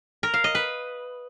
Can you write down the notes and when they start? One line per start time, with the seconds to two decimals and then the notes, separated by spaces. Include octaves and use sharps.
0.23 A#4
0.34 F5
0.44 D#5
0.55 B4